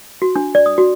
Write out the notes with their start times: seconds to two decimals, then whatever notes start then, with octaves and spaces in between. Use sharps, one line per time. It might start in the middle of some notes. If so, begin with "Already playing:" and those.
0.22 F#4
0.36 D4
0.55 D5
0.66 D#6
0.78 F#4